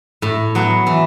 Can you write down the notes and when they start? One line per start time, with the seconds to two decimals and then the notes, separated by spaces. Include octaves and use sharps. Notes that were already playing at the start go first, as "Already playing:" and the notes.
0.22 A2
0.55 F#3 B3 F#4
0.87 E3